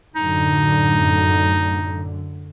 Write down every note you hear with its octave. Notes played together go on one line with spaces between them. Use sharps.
F#2 A2 D3 D#4